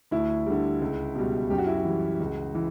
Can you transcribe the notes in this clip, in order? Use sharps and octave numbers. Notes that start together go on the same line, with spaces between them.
D2 E4
D3 G3
C#2
B2 G3
F#2 G4
F#4
E4
F#4
E3 G3
C#2
E3